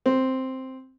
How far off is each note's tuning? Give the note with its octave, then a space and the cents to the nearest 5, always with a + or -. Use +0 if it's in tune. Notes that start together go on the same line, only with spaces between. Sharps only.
C4 +0